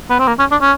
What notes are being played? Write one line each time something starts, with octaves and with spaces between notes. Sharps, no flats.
B3
C4
A#3
C#4
D4
C#4